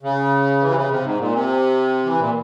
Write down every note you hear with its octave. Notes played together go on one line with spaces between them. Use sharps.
C#3
E3
C3
C#3
C3
G#2
A#2
C3
E3
A#2